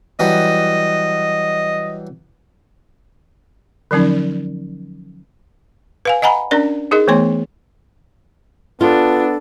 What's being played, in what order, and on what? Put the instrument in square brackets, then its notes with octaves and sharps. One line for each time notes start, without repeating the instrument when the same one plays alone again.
[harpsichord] E3 F#3 G3 [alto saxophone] D#5
[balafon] D3 F3 F#3 C#4 D#4
B4 F5 G#5
D#5 F#5 G#5 A#5 B5
C#4 D4 A#4 D5
D#4 G#4 A#4 D#5
E3 A3 B3 C#5 C6
[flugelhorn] B3 [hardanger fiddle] D4 [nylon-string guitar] F4 [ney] A4